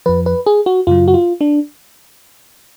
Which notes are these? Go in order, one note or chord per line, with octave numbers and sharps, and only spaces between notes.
F2 F3 B4
B4
G#4
F#4
F#2 C#3 F#3 F4
F#4
F4
D4